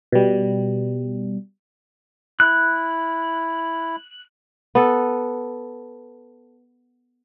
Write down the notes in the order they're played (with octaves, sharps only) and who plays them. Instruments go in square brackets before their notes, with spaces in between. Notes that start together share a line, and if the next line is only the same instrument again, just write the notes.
[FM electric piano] B2 G3
[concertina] E4 [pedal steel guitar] F#6
[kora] B3 A4